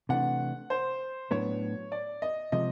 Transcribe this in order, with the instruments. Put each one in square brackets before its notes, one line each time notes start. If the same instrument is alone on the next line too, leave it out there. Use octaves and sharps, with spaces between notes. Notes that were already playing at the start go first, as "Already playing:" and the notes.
[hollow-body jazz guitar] C3 E3 A3 D4 [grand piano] F#5
[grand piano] C5
[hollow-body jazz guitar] A2 F#3 B3 D4 [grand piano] C#5
[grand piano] D5
D#5
[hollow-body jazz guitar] C3 F3 G#3 [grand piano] D#5